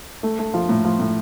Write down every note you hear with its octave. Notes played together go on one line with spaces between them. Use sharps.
A3
A3
F3
A2
F3
A2